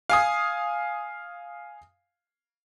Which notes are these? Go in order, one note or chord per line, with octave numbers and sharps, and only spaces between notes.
F5 G#5 D#6